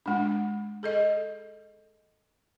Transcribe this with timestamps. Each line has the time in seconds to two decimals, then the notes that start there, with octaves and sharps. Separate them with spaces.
0.06 G#3 D4
0.83 G#4 A4 D#5